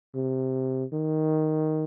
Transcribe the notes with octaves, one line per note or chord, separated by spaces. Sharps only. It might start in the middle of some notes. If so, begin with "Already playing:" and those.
C3
D#3